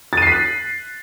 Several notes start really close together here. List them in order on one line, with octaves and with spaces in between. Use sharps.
A6 D#7 C7 B6 F#6